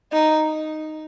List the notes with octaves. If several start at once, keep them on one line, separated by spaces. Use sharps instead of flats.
D#4